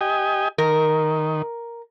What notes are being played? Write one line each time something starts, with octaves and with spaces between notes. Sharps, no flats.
G4 D#5 G#5
D#3 A#4